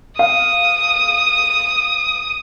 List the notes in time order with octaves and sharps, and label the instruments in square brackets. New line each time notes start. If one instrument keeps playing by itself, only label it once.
[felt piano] F5 [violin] D#6